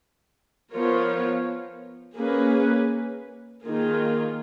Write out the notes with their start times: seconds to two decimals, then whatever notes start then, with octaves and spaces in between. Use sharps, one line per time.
0.72 F3 B3 F4 A#4 C#5
2.18 A#3 C#4 G#4 B4
3.65 D#3 A#3 F4 G#4